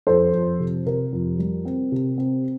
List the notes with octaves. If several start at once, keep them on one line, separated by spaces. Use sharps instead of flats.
F2 A4 C5
F2
C3
C3 A#4
F2
G3
C4
C3
C4